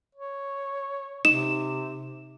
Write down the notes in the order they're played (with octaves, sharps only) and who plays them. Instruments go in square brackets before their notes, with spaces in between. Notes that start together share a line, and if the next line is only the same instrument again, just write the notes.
[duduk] C#5
[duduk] C3 [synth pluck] D#4 [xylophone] E7